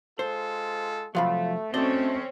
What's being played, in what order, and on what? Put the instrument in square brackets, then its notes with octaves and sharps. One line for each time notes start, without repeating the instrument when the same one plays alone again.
[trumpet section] G#3 F4 A4 [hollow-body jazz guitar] C5
[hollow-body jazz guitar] C3 F3 F#3 [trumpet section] A3 [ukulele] F4 F5 B5
[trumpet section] A3 [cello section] C4 C#4 [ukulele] F#4 D5 [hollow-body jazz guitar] A4 D#5